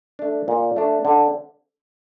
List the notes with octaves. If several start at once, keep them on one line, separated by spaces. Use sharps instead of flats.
A3 D4
A#2
A3 D4
D3